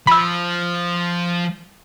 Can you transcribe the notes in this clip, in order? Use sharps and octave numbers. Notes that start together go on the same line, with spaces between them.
F3 B5 E6